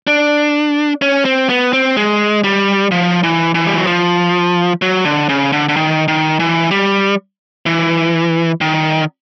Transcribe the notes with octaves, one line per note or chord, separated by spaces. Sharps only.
D4
C#4
C4
B3
C4
G#3
G3
F3
E3
E3
G3
F#3
F3
F#3
D3
C#3
D3
D3
D#3
D#3
E3
G3
E3
D#3